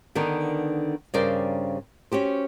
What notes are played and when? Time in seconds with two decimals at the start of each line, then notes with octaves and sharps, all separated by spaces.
0.15 D3 D#3 B3 D4 D#4
1.14 G2 C#3 A#4 C5 D5 G5
2.12 C#4 F#4 G4 C5